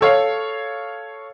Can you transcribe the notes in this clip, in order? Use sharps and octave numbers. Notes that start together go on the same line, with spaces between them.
A4 C#5 F5